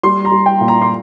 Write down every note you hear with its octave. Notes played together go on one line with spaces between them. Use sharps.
G3 C6
A#5
G3
G5
A#2
A#5
C6